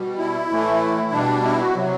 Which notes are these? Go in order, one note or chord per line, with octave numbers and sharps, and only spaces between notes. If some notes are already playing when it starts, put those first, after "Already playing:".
Already playing: B2 G3
E4
A2 E3 A3
B2 G3 D4
E4
F#4
C3 F#3